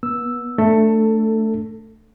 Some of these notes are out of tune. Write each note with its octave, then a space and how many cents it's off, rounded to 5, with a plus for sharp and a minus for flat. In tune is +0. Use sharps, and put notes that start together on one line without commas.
B3 -35 E6 +0
A3 +0 D4 +0 A4 +15